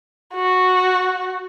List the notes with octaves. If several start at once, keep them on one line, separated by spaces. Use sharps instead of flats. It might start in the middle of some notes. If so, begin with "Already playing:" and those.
F#4